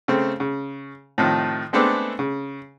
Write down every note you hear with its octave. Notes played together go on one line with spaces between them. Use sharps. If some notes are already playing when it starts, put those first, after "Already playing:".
C#3 A3 C4
C#3
A2 C3 D#3 F3
G#3 A3 B3 C4 D4 A4
C#3